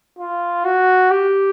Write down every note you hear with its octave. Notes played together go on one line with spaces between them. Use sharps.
F4
F#4
G4